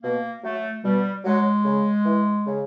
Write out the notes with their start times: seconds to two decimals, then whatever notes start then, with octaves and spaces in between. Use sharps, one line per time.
0.03 B2 A#3
0.43 F#3 A3
0.83 B2 G3
1.24 F#3 G#3
1.65 C#3
2.05 E3
2.46 C#3